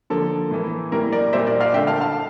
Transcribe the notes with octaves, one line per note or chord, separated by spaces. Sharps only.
D3 F3 A#3 A4
A2 E3 A#3
A2 G3 A#3 A#4
A#4 D5
A#2 G3 A#3 C5 E5
A#4 D5
D5 F5
D3 A3 E5 G5
F5 A5
F5 A5